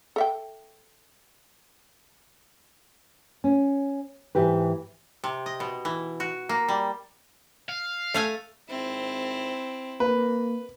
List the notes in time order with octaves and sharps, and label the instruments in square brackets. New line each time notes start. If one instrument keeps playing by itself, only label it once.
[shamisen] A4 E5 G5
[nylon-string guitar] C#4
G#2 E3 G4 B4
[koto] C3
D#5
B2
E3
F#4
A#3
G3
[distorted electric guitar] F5
[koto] A3 F5 G#5
[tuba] G#1 [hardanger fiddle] C4 E4
[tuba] A#3 [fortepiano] B4